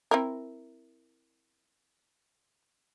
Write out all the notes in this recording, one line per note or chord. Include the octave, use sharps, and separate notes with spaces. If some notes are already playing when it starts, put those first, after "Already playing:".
C4 E4 A#4